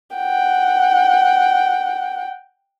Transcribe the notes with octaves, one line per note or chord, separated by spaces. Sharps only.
F#5 G5